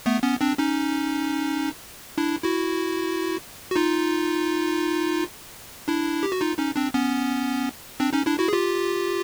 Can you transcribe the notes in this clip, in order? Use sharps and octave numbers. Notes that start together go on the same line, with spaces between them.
A3 B3
B3 C#4
C4 D4
C#4 D#4
D4 E4
E4 F#4
F#4
D#4 F4
D4 E4
G4
F#4
D#4 F4
C#4 D#4
C4 D4
B3 C#4
C4 D4
C#4 D#4
D4 E4
E4 F#4
G#4
F4 G4